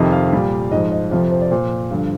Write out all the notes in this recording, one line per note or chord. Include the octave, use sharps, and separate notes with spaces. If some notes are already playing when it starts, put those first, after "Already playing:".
Already playing: F2 C3 D#3 D#5
F5
A#2 G3
G#2 F3 D#5
D#5
F2 C3 F3 F5
C5
D5
A#2 F3 C5
G2 D3 F3